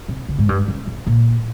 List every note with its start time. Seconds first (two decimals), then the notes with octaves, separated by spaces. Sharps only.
0.08 C3
0.29 C#3
0.38 G#2
0.49 G2
0.68 C#3
0.87 C3
1.07 A#2